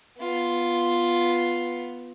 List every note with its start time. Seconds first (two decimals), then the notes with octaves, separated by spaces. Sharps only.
0.20 B3 F4